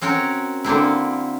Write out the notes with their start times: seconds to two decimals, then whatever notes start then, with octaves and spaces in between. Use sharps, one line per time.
0.02 C4 C#4 F#4 A#4
0.64 D3 A#3 C4 E4